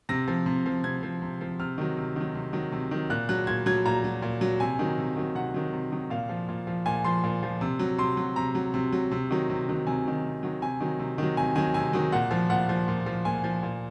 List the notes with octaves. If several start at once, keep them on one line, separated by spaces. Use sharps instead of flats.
C3 A#6
F3
C3
F3
C3 G#6
F3
C3
F3
C3 F6
D#3 F#3
C3
D#3 F#3
C3
D#3 F#3
C3
D#3 F#3
A#2 F#6
F#3 F#6
A#2 G#6
F#3 G#6
A#2 A#5
F#3
A#2
F#3
C3 G#5
D#3 F#3
C3
D#3 F#3
C3 F#5
D#3 F#3
C3
D#3 F#3
A#2 F5
F3
A#2
F3
A#2 G#5
F3 C6
A#2
F3
C3
F#3
C3 C6
F#3
C3 A#5
F#3
C3
F#3
C3
D#3 F#3
C3
D#3 F#3
C3 G#5
D#3 F#3
C3
D#3 F#3
C3 G#5
D#3 F#3
C3
D#3 F#3
C3 G#5
D#3 F#3 G#5
C3 G#5
D#3 F#3
A#2 F#5
F3
A#2 F#5
F3
A#2
F3
A#2 G#5
F3
A#2